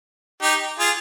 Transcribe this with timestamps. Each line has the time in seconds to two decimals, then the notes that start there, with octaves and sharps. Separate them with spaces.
0.42 D#4 G4
0.79 F4 G#4